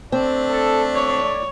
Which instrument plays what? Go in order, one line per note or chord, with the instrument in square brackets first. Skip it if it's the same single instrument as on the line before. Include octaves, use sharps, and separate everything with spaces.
[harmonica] A3 D4 [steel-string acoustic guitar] C4
[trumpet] A4
[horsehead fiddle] C#5 [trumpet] D5